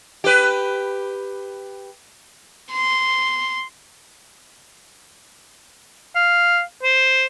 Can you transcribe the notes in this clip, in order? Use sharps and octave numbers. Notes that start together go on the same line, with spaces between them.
G4 B4
C6
F5
C5